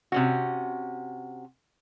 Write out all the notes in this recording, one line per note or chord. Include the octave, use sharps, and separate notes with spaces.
C3 C#4 F#4